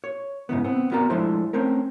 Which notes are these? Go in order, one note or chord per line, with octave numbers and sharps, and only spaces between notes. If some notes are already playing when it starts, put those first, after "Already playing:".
C#5
G#2 C#3 E3 B3
B3 C4
B3 F#4 A#4 D5 A#5
F3 G#3 A3 D4 E4 C5
A3 C4 C#4 A#4